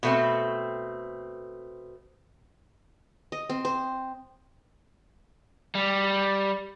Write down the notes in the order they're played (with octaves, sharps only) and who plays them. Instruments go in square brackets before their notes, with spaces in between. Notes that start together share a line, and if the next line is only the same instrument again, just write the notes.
[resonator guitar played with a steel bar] B2 A3 C4
[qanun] D#5
C4
C5
[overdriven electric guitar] G3